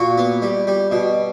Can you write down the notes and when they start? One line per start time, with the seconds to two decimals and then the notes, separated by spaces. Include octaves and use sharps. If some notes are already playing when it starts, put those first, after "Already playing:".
Already playing: A#2 F#4
0.18 B3
0.42 G3
0.67 G3
0.92 B2